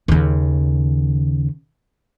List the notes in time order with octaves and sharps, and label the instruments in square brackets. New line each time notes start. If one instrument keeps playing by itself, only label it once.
[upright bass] D#2 C#3